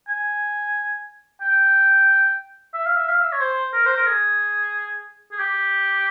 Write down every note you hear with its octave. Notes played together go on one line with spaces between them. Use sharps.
G#5
G5
E5
F5
E5
F5
E5
C#5
C5
A#4
C5
A#4
G#4
G#4
G4